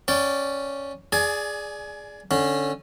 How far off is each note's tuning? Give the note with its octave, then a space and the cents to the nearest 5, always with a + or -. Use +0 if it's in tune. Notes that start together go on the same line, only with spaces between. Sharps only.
C#4 +0 D5 +0 G5 -30
G#4 +0 D5 +0 G#5 +25
D3 +0 C#4 -15